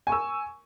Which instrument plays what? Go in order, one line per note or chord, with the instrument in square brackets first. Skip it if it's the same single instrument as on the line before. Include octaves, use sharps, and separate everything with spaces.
[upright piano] G#5
C#6
E6